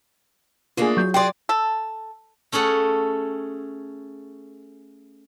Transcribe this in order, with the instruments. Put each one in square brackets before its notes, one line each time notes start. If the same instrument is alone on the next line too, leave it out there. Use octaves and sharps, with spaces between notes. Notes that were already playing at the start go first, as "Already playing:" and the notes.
[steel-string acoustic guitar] A3 A#3 D4 [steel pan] F4 G#4
[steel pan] F#3 [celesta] C#6 G6
[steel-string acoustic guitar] F#4 G#4 D5 [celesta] G5 C6
[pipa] A4
[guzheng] A3 C#4 G#4 A4 F#5